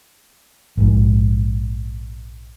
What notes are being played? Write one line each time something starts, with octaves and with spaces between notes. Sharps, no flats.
A#1 G#2